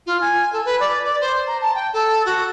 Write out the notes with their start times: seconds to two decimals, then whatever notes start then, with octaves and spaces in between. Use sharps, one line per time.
0.06 F4
0.20 G#5
0.52 A4
0.65 B4
0.79 D5
1.04 D5
1.20 C5
1.46 A#5
1.61 A5
1.74 G5
1.93 A4
2.25 F#4